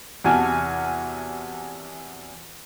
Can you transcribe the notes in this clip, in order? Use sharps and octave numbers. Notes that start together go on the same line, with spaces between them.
E2 C3 F#4 G#5 A5 F6